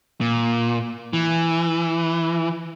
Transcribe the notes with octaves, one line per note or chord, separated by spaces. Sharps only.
A#2
E3